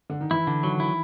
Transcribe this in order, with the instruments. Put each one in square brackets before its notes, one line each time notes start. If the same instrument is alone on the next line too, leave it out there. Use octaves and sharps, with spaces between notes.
[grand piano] D3
D#3
[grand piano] E3 [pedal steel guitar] E4
[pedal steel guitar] D3
[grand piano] D#3 [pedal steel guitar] F#3
[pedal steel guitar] E4